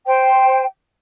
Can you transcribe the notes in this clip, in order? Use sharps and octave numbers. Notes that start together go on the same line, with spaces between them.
C5 G5